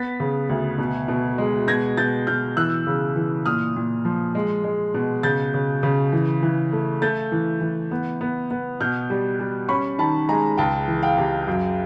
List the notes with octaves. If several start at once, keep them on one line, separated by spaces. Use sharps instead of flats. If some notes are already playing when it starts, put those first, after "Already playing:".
Already playing: B3 A6 B6
C#3
D2
B2
B2
G#3
B2 G#6 A#6
B2 G6 A6
B2 F6 G6
E3 E6 F#6
C#3
E3
A#2 D#6 F6
A#2
F3
G#3
G#3
B2
C#3 G6 A6
C#3
C#3
E3
E3
A3
A3 G6 A6
E3
E3
B3
B3
B3
B2 F6 G6
G3
G3
C#4 B5 C#6
D#3 A5 B5
G#3 G#5 A#5
C#2 G5 A5
E3
F5 G5
C3
F#2